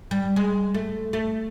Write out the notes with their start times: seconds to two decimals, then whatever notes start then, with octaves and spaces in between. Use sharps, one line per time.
0.11 G3
0.36 G#3
0.75 A3
1.13 A3